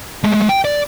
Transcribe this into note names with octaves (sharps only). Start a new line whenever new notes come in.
G#3 A3
G5
D5